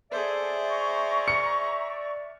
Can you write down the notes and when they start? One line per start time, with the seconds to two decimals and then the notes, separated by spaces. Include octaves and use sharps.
0.11 G#4 A4 C5 D5 E5
0.69 A#5 C#6
1.28 C#7